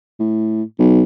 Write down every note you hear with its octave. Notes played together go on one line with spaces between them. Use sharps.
A2
B1